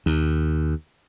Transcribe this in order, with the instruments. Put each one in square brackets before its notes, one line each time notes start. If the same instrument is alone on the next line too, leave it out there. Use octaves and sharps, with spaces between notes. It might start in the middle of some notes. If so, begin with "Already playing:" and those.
[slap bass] D#2